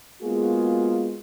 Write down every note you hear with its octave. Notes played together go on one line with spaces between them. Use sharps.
G#3 A#3 B3 F4 F#4 G#4